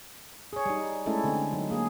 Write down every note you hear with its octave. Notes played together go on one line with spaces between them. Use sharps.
G#4 C#5
G3 D#4
G#3 A3 C#4 E4 A4
D3 C4
F#3 D#4
A#3 G#4